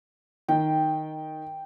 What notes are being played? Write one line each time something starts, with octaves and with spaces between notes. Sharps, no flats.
D#3 G5